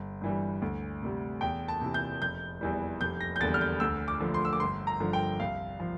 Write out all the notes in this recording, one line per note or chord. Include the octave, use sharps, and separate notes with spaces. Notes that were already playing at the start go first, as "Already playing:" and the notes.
Already playing: G1
G2 E3 G3
D2
C3 G3
E2 G5
A5
C3 E3
G6
F1 G6
E2 E3 G3
F1 G6
A#6
G6
E2 D3 G3 A6
F6
G6
D2 E6
D6
D3 F3
C6
E6
D6
G1 C6
A#5
G2 D3 F3
G5
C2 F5
F3